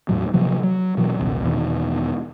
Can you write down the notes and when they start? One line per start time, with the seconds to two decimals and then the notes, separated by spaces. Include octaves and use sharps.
0.09 E2 A2 F#3
0.34 C3 F3 F#3
0.63 F#3
0.97 B2 E3 F#3
1.19 A#1 D#2 C3
1.43 E2 B2 D#3